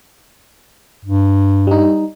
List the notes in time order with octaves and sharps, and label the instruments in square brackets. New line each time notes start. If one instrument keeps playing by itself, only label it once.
[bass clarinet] G2
[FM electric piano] G3 D#4